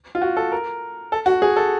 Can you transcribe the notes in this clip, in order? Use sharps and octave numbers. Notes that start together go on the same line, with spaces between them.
F4
F#4
A4
A#4
A4
F#4
G#4
A4